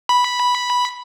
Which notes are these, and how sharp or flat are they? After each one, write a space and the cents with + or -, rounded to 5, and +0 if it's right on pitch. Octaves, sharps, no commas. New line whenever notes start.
B5 -5